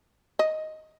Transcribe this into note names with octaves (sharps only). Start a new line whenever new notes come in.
D#5